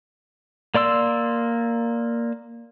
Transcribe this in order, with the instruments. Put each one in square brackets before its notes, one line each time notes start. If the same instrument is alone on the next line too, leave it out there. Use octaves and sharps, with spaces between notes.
[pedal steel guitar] A#3 D5 C6 E6